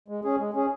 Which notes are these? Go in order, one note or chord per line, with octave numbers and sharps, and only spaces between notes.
G#3
C#4 G#4
G#3
C#4 G#4